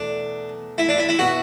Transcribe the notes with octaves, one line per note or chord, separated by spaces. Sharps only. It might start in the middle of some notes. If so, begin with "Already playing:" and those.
Already playing: E2 B2 A3 D4
E4
D4
E4
E4
B2 B3 E4 F#4